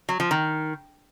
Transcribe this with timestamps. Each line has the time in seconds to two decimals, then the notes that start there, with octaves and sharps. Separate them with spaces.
0.09 F#3
0.20 F3
0.31 D#3